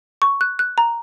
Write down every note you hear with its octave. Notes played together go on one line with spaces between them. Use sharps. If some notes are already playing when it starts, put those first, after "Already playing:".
C#6
F#6
F#6
A#5